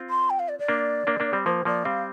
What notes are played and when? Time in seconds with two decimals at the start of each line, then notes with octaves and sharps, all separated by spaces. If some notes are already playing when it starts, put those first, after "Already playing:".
Already playing: C4 F4
0.10 C6
0.30 G5
0.39 F5
0.49 D5
0.59 D5
0.68 A#3 D4
1.07 A#3 D4
1.20 A#3 D4
1.33 G3 C4
1.46 F3 A#3 C5
1.65 F3 A#3 D5
1.85 G3 C4 F5